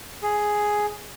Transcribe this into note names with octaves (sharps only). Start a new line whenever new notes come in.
G#4